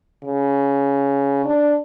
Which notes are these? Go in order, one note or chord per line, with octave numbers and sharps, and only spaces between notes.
C#3
D4